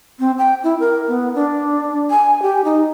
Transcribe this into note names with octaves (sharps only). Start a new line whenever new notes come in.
C4
G5
E4
A#4
B3
D4
G#5
G4
D#4